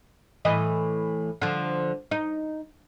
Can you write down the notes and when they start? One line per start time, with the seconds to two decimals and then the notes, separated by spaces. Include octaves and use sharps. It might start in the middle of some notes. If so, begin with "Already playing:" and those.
0.45 A2 E3 D#5
1.42 D3 F3
2.11 D#4